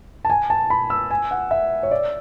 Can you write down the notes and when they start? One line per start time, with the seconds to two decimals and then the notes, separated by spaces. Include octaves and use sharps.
0.25 A5
0.30 G#5
0.50 A5
0.70 B5
0.90 E6
1.11 G#5
1.31 F#5
1.51 E5
1.83 C#5
1.91 D5